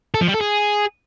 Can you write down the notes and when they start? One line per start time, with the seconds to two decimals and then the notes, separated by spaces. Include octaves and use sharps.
0.14 A4
0.21 F3
0.28 G3
0.34 A4
0.41 G#4